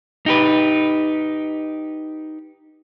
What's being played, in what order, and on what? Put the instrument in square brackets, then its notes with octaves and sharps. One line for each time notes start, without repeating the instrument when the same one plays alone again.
[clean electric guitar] D#4 G4 B4